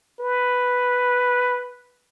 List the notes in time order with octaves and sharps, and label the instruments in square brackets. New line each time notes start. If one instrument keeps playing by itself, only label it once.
[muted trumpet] B4